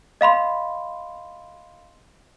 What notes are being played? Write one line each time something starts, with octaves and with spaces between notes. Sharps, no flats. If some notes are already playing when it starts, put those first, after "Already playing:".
D#5 F5 B5 C6